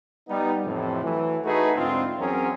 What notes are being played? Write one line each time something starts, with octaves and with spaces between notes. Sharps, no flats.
G3 B3 D#4
F2 A2 C3 E3 F3
E3 F#3 A3
A3 D#4 F#4 G#4 B4
D2 G#2 C4 D4 D#4 F4
E2 F#3 C4 C#4 G#4 A#4